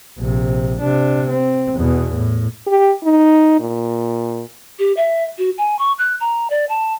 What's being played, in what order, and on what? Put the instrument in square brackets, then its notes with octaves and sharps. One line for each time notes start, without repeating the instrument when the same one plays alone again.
[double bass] A#1 C3
C3 D4
C4
E2 B2
A2
[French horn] G4
D#4
A#2
[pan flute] G4
E5
F#4
G#5
C#6
F#6
A#5
D5
A5